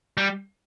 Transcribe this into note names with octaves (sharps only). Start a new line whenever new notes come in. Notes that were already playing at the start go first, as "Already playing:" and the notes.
G3